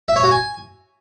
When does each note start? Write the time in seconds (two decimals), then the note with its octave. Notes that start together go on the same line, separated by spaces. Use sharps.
0.08 E5
0.16 C#5
0.24 F#4
0.31 G#5